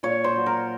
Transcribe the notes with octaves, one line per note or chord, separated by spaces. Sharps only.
A#2 C#5
C5
F#3
A#4